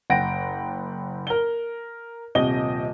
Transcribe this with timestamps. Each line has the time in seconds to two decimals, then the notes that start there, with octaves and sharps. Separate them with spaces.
0.10 F#1 F#5 G5 A#6 D7
1.27 A#4 G7
2.35 D#1 C3 D#5 G7